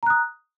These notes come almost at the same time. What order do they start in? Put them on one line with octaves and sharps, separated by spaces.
A#5 F#6 D#6